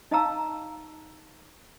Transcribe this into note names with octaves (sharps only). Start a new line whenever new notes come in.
D#4 D#5 F5 A5 A#5 E6